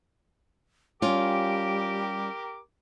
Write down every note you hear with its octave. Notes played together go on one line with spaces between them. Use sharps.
G3 C#4 F4 G4 A#4 D6